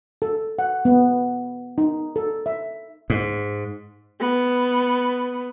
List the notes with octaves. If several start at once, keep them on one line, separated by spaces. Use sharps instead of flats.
A4
F#5
B3
D#4
A4
E5
G#2
B3